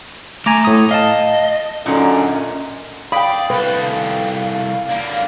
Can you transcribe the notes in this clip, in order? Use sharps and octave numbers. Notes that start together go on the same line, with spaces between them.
A3 G#5 A#5 D6
A2 D#6
D#5 F5 A5
F#2 A#2 D3 C#4 D#4
D5 F5 G5 B5 D#6
C2 A4 B4
D3 A#3